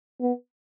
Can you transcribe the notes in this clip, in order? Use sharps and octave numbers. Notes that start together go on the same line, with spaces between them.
B3